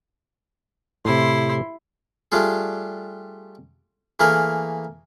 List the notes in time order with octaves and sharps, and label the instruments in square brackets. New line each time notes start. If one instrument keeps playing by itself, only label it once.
[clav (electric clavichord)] A2 C3 [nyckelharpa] E4 C6
[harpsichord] G3 A3 D4 F4 G#4
E3 A3 A#3 G#4 A#4 B4